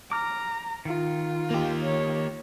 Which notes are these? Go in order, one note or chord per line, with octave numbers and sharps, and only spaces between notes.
A#5 D6 F6
D#3 F4
A#3 G4
C#5